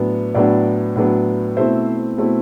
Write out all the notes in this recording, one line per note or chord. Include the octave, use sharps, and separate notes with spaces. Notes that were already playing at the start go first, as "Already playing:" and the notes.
Already playing: A2 F#3 B3 D4
A2 F#3 B3 D4 D5
A2 F#3 B3 D4
B2 A3 C4 E4 C5 E5
B2 A3 C4 E4